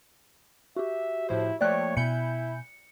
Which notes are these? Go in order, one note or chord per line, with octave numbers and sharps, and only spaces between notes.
F#4 G4 E5
A2 F3 E4 C5
F3 A3 A#3 C#5 D5 G5 F#6
B2 E4 G#5 B5 G6 C#7